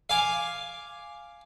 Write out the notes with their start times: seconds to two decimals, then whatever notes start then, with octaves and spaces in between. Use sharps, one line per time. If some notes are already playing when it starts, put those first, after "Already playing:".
0.10 F5 G#5 D6